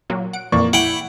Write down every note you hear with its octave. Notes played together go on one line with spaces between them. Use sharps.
A#2 F#3 A#3
F#5 D7
F2 A#2 E3 A#3 D5 C#6
E4 F#5 G5